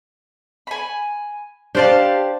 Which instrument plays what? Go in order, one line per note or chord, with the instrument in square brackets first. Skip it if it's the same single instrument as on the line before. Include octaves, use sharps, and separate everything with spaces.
[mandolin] G#5 B5
[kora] D4 C5 D5 [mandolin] G4 F5 A5